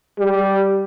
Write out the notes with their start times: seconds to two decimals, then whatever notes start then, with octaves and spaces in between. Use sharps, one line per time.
0.19 G3